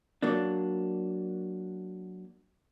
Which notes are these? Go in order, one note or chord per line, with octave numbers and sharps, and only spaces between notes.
F#3 A#3 D4